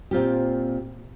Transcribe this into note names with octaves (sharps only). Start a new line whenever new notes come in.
A#2 C4 F4 G4